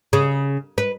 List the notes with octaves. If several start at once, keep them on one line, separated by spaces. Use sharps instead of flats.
C#3
B4